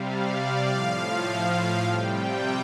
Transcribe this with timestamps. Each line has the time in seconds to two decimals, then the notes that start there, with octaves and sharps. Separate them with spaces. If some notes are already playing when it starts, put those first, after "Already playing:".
Already playing: C3 G3 F5
0.10 D5
0.39 D5
0.68 A2 F3 F5
1.84 C3 G3 G5